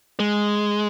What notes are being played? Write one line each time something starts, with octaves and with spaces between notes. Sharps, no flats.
G#3